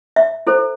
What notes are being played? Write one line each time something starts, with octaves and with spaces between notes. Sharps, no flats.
E5
E4 A4 C5